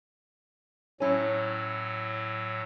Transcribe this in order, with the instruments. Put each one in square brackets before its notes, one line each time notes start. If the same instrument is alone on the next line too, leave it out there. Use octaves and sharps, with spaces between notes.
[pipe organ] A2 F#3 [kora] C#4 E4